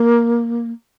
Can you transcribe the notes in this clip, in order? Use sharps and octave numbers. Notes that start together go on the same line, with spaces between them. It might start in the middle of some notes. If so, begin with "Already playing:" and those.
Already playing: A#3